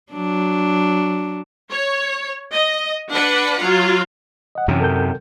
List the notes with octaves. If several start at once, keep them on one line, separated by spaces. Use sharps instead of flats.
F#3 D4
C#5
D#5
D4 B4 F#5
F#3 F4
D#5 F#5
F#2 C3 E3 C#4
A4 A#4 G6